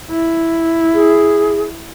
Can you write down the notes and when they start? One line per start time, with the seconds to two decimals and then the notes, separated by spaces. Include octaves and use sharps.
0.11 E4
0.94 G#4